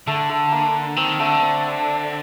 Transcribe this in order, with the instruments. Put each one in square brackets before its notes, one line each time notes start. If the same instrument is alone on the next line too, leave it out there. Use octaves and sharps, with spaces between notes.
[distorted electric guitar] D3 [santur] A3
[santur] A3
A#3
[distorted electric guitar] D#3 [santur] C4
[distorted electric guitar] D3 [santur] A3
[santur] C4